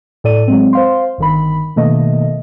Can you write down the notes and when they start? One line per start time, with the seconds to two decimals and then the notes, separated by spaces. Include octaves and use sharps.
0.24 A2 A4 D5 D#7
0.48 F#3 G#3 C4
0.73 C5 F5 C6
1.18 G1 D#3 B5
1.76 B2 D#3 A3 A#3 D#5